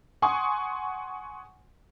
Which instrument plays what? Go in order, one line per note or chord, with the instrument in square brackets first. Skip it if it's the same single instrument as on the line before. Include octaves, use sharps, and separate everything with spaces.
[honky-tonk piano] F#5 G#5 C6 C#6 D#6